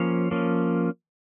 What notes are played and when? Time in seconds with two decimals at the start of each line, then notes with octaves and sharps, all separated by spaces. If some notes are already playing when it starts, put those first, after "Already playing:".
Already playing: F3 A#3 C#4 C#5 F5
0.31 F3 A#3 C#4